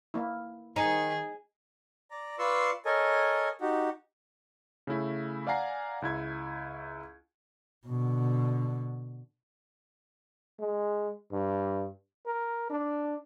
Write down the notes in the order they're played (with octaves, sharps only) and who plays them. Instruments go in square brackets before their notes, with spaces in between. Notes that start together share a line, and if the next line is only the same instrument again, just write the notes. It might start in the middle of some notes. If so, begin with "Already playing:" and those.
[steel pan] A#3 E4
[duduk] D#3 [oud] D#4 [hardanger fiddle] G#4
[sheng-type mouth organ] D5 A#5
F4 B4 D5 C6 C#6 E6
A4 A#4 C#5 D#5 G#5
D#4 F#4 G4
[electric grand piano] C#3 A3 E4
D5 F5 F#5 G#5 A#5 C7
C#2 E4 G#6
[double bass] B2 D3
[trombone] G#3
G2
A#4
D4